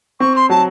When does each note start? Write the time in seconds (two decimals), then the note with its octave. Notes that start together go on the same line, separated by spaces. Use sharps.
0.20 C4 C#6
0.36 C6
0.50 F#3 A5